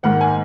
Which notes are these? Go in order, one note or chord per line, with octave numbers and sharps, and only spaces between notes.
G#2 D#3 A#3 F#5
G#5